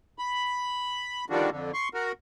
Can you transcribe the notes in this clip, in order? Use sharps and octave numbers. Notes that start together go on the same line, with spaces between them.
B5
D3 D#3 F3 G3 D4 F#4
F2 D3
C6 C#6
F#4 A#4